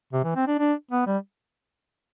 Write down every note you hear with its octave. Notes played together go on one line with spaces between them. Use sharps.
C3
E3
C4
D4
D4
B3
G3